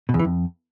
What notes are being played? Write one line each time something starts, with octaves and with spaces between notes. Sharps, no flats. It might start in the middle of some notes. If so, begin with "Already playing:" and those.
B2
E2
E3
F2